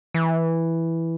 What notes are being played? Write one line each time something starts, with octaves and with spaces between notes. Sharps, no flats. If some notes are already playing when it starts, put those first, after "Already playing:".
E3